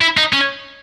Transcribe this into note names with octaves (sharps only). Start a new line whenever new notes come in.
E4
D#4
C#4